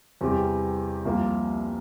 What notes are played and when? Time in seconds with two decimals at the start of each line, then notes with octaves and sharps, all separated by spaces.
0.21 E2 C3 G3 C4 G4
1.05 C2 C3 F3 A#3 F4